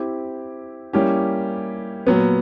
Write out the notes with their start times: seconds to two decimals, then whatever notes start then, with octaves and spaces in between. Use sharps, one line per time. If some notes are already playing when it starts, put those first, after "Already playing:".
Already playing: C4 E4 G4
0.93 G3 A#3 C#4 E4 G4
2.07 A#2 F#3 B3